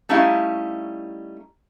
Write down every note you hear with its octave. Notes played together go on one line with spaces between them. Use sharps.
G3 A3 C#4 D#4 E4 F5